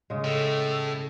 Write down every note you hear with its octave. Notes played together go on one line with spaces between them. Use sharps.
C#3 G#3
A2 A4